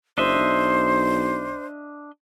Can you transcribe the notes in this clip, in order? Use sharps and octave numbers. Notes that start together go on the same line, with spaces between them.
F#1 D4 C5 D#5 E5
B1